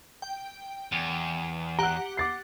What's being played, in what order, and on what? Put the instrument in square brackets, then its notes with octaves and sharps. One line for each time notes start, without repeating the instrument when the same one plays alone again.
[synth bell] G5
[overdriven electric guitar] E2
[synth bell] G4 F#5 [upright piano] A#5 F#6
[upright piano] D6 A6 C7